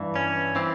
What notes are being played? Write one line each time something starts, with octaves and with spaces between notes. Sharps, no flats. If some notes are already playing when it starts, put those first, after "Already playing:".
Already playing: G2 E3
C#4
E3 C4